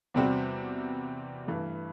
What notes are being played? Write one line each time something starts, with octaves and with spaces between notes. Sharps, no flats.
E2 C3 G3 C4 F#4
G2 E3 A3